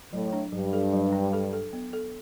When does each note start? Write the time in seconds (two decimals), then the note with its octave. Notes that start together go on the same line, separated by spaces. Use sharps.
0.13 A2 F#3
0.33 D4
0.52 G2 F#3
0.73 A4
0.93 F#3
1.12 D4
1.33 A4
1.53 A4
1.73 B3
1.93 A4